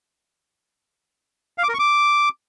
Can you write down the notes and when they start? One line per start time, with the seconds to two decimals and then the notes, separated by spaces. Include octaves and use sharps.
1.58 F5
1.63 D6
1.69 A#4
1.74 C#6
1.79 D6